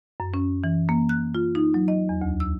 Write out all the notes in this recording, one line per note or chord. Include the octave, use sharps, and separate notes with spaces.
F#2
C#4
E3
A#3
F#6
F4
D#4
F#3
D#5
E2
D2
E6